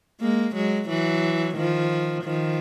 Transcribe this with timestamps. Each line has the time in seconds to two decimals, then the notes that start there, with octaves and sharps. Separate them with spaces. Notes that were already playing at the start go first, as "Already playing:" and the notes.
0.21 G#3 A#3
0.55 F#3 G#3
0.88 E3 F#3
1.56 D#3 F3
2.23 D#3 F3